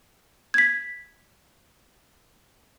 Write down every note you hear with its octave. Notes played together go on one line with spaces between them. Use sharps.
G#6 B6